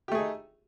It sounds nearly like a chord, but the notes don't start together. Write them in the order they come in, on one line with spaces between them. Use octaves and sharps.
G4 A3 G#4 D#4